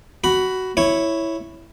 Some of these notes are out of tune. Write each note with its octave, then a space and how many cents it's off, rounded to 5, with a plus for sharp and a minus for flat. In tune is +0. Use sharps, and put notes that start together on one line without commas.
F#4 +15 B5 +0
E4 +0 C#5 +0